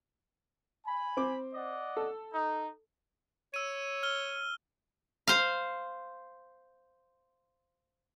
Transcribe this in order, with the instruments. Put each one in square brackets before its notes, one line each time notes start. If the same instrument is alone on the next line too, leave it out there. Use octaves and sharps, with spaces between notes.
[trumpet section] G#5 B5
[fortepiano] C4 D6
[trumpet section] D5 D#5 F#5
[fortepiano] A4
[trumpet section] D#4
[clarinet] C#5 [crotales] E6 D#7
[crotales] F6 G7
[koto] C5 F5